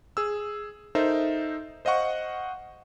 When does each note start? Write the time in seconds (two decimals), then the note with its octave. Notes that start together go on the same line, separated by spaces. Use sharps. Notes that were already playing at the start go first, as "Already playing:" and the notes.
0.17 G#4 E6
0.95 D#4 A4 A#4 C5 E5
1.85 C5 D#5 F5 F#5 C#6